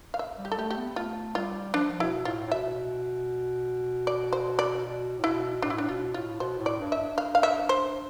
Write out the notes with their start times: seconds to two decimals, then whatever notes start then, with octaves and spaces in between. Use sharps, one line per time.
0.14 F5
0.19 E5
0.38 G3
0.45 G4
0.52 A4
0.57 A3 G4
0.70 G4
0.77 B3
0.90 B3
0.96 A3 F4
1.35 G3 F4
1.74 F3 D4
2.00 B2 E4
2.25 A2 F4
2.47 A2
2.51 B2 E5
4.07 D5
4.33 C5
4.59 D5
4.85 B2
5.19 A2
5.24 B2 E4
5.62 A2 D4
5.70 E4
5.78 A2 D4
5.89 B2 F4
6.14 A2 F4
6.40 B2 C5
6.59 A2
6.66 D5
6.79 G2
6.92 E5
6.98 G2
7.18 F5
7.35 F5
7.43 E5
7.69 C5